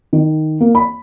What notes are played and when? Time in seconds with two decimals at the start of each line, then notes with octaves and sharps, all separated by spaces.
0.13 D#3
0.60 A#3
0.75 B5